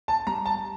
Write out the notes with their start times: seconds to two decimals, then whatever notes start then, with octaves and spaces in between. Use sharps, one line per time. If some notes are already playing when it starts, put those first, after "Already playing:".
0.08 A5
0.27 G3 A#5
0.46 A5